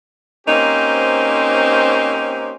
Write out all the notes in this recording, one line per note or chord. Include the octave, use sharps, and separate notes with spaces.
A#3 C4 C#4 D#4 G4 C5